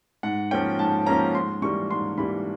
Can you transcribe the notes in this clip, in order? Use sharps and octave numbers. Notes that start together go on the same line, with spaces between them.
G#2 F#5
F3 A#3 C#4 G5
G#2 A5
F3 A#3 C#4 A#5
G#2 C6
E3 G3 A#3 C#6
G#2 C6
E3 G3 A#3 B5